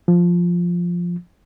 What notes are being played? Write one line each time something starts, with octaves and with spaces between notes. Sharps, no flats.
F3